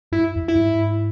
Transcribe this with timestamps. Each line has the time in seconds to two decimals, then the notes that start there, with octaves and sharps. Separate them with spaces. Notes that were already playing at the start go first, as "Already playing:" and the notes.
0.12 G2 E4
0.36 F2
0.48 E4
0.55 G2
0.60 G#2